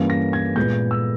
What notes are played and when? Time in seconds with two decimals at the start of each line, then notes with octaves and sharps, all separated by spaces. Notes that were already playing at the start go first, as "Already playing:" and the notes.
Already playing: G2 E3 A#3 C#4
0.10 A#6
0.33 G#6
0.56 A#2 G#3 B3 G6
0.91 E6